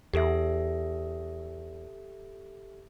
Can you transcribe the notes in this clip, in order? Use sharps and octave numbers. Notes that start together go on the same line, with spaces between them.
E2 G4 A4 E5